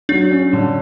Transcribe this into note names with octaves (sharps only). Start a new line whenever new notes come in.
F#3 D4
C#4
D3